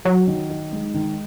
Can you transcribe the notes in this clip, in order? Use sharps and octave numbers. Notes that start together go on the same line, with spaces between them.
F#3 F#4
D#3
D#4
G#3
D#3